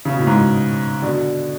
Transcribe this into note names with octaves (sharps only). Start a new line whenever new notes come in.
C#3
B2
A2
G#2 B2
B2 D3